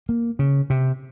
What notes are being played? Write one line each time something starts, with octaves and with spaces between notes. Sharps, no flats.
A#3
C#3
C3